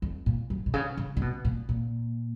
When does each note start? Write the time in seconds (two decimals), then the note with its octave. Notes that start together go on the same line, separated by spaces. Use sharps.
0.02 F2
0.26 A#2
0.50 F#2
0.66 B2
0.74 C#3
0.97 C#3
1.17 C#3
1.22 B2
1.45 A#2
1.69 A#2